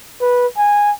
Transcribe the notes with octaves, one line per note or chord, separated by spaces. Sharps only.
B4
G#5